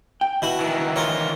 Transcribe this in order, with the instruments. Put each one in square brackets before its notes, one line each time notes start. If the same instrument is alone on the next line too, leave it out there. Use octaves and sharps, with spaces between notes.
[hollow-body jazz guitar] G5
[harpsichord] B2 E4 F#4
[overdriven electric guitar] D#3 E3
[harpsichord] F4 A#4 C#5